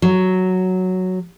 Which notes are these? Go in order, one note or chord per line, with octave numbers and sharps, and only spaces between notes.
F#3